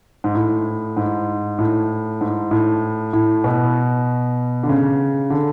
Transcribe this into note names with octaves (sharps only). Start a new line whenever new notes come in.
G#2
A2
G#2
A2
G#2
A2
A2
B2
D3
C#3
D3